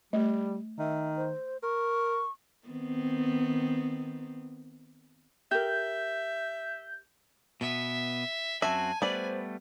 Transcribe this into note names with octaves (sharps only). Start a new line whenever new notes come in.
G3 A3
D#3 E5
C5
A#4 C#6
D#3 B3 C4
G4 A#4 E5 G6
B2 B3 E5
F#2 C4 F#4 E5 G#5 A5
G3 A3 B3 B4 C5 D5